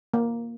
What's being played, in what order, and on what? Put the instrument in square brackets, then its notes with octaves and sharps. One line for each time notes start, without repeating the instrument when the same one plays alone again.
[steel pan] A#3